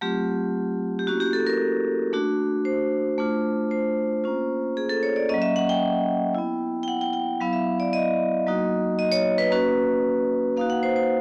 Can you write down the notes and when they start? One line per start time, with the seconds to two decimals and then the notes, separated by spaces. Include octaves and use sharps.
0.01 F#3 A3 C4 F4 G4
0.99 G4
1.07 A#3 C#4 E4 F#4
1.20 G4
1.33 A4
1.47 A#4
2.13 A3 D4 F#4
2.65 C5
3.18 A3 D4 F4
3.71 C5
4.24 A#3 C#4 F4
4.77 G#4
4.90 A4
5.03 C#5
5.16 D5
5.29 F#3 A#3 C#4 D#5
5.42 E5
5.56 F#5
5.69 G5
6.35 B3 E4
6.83 G5
6.88 F#5
7.01 G5
7.13 G5
7.41 F#3 B3 E4 F5
7.53 E5
7.80 D5
7.93 D#5
8.46 F#3 A#3 D#4 F#4
8.99 D#5
9.12 C#5
9.38 B4
9.51 A#3 C#4 F#4 B4
10.57 A#3 D#4 F#4 F5
10.70 F#5
10.83 C5
10.96 C5